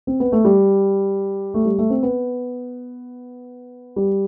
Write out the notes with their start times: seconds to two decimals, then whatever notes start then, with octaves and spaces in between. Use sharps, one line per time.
0.07 C4
0.20 B3
0.32 A3
0.45 G3
1.54 A3
1.65 G3
1.78 A3
1.90 C4
2.03 B3
3.96 G3